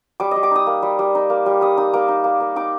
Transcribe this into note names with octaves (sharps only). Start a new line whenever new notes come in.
G3 D6
G3 D#5
D6
D#4 D#6
A#3
G3
G3
D#4
A#3
G3
G3 D#6
D#4 D#6
A#3 D6
D#4
A#3
A#3
D#4 D6